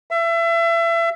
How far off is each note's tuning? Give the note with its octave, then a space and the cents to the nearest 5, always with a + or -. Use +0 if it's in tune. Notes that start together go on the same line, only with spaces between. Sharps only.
E5 +30